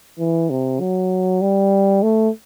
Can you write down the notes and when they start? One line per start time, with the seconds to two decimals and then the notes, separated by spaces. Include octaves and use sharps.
0.19 E3
0.50 C3
0.80 F#3
1.41 G3
2.03 A3